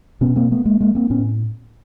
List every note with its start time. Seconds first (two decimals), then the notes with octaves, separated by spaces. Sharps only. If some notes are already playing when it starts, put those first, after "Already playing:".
0.21 B2 B3 C#4
0.36 A#3 C4
0.51 A3 B3
0.65 G#3 A#3
0.80 G#3 A#3
0.95 A#3 C4
1.10 A2 B3 C#4